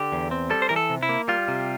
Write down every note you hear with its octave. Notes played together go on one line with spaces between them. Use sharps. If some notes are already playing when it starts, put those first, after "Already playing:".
Already playing: D3 G4
E2
C4
G3 A4
C5
E3 A#4
A4
C3
E4
A#3
G3 F4
C3